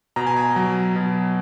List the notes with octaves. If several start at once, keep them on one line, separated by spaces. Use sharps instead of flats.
B2 A#5
G#5
A#5
F#3
B2